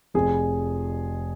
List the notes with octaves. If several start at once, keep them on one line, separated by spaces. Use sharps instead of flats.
F1 F2 F3 G#4